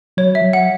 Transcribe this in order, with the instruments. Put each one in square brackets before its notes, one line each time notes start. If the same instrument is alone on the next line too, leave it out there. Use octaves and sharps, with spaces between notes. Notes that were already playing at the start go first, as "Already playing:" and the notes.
[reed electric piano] F#3 [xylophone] C#5
[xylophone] E5
[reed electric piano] F#3
[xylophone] F#5